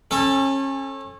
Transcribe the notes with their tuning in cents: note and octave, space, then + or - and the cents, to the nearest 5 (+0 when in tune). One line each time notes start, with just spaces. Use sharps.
C#4 -30 A4 +0